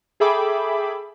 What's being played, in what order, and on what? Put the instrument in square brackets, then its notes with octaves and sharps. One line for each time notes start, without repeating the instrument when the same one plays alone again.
[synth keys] G#4 A4 E5 G5 B5 D6